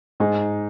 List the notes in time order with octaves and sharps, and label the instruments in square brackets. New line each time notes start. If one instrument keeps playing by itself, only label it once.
[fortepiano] G#2 [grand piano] D#4 G#4